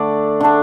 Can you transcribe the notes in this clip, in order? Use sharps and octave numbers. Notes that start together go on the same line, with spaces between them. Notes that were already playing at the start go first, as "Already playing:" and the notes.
Already playing: D3 A3 D4 D5
D3 A3 D4